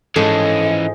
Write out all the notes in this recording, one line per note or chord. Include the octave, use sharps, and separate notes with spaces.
G#2 E3 F3 C#4 G#4 A4 D#5